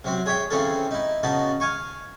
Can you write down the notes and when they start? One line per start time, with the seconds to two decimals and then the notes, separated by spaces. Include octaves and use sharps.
0.04 C3 F#3 C4
0.26 G#4 C#5 E5 G5
0.50 C#3 E3 C4 C#4 G#4 A4
0.91 D#4 E4
1.23 C#3 B3 D#4 F#4 A5
1.60 F5 G#5 C#6